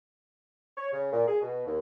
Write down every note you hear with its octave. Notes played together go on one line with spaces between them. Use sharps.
C#5
C#3
A#2
G#4
B2
D#2